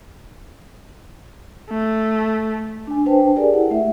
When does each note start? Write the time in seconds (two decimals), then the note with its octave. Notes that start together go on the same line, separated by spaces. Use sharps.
1.70 A3
2.87 D4 G#5
3.06 D4 B4 C5 G5 A5
3.36 G4 G#4 A#4 D5 G#5
3.53 E4 F#5
3.71 A3 E5